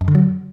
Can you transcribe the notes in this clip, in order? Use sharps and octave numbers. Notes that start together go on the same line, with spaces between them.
F#2
D3
F#3